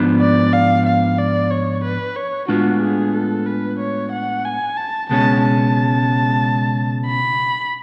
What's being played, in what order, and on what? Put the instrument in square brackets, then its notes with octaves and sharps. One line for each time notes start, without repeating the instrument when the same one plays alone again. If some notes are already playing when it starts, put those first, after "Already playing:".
Already playing: [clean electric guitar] G#2 F3 B3 D4
[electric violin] D5
F5
F5
D5
C#5
B4
C#5
[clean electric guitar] A2 G#3 B3 D4 F4 [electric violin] F#4
[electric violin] G#4
A4
B4
C#5
F#5
G#5
A5
[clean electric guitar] C#2 B2 G#3 C#4 [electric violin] A5
[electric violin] A5
B5